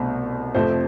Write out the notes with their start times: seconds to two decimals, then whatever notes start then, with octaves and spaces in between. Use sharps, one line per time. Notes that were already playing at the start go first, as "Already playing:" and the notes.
Already playing: C2 B2 A3 C4
0.54 F2 C3 F3 A3 C5